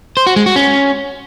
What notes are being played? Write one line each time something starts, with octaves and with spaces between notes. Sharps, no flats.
C5
F#4
G#3
F#4
C#4